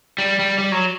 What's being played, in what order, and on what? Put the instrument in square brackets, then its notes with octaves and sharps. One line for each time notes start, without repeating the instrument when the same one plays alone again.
[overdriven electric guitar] G3
G3
G3
F#3